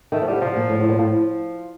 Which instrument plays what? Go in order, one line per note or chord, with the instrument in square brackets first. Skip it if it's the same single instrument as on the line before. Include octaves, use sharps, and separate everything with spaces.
[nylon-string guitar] D#3 [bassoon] A3
[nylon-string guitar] F3
[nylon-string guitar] D3 [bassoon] G3
[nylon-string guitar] C3 [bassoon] F3
[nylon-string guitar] A#2
A2
A2
A#2
[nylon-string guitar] A2 [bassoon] F3